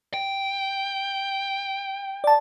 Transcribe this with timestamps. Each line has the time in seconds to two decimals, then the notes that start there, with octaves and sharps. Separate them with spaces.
0.14 G5
2.24 D5 A5